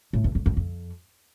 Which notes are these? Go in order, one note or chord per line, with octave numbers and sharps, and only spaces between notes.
A2
E2
F2
F2
F2